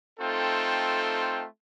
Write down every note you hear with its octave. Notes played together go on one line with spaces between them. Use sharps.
A3 C4 D#4 F4 A4 G5